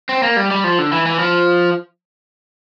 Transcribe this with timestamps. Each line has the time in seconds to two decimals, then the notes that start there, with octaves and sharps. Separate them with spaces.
0.09 C4
0.23 A#3
0.36 G3
0.51 G3
0.64 F3
0.79 D3
0.92 E3
1.06 E3
1.19 F3